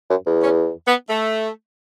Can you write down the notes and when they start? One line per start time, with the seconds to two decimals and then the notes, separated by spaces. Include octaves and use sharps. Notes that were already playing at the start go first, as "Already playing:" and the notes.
0.10 F#2
0.26 E2
0.43 C#4
0.88 B3
1.09 A3